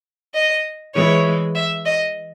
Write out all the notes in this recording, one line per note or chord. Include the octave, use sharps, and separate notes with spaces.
D#5
E3 G#3 C#5
E5
D#5